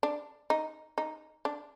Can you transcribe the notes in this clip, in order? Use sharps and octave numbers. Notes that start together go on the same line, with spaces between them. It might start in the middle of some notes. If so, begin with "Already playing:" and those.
D4
D#4
D#4
D4